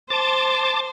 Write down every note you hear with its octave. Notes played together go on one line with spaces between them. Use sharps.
C5 A5 D6